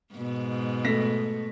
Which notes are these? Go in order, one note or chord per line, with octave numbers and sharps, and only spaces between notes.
G#2 B2
A3 A#6 B6